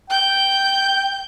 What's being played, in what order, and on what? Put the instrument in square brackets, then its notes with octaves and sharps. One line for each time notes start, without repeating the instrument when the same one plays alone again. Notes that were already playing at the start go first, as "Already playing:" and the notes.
[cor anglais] G5 [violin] G6